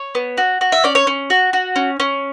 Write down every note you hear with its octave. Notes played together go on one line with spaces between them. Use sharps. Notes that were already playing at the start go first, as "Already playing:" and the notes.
Already playing: C#5
B3
F#4
F#4
E5
C#4 D5
C#5
C#4
F#4
F#4
C#4
C#4